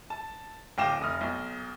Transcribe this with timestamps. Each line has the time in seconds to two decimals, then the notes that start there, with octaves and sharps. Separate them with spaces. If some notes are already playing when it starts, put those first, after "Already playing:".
0.10 A5
0.78 D1 F5 G5 D6 A#6 E7
1.01 F1 D#6 F6
1.21 B1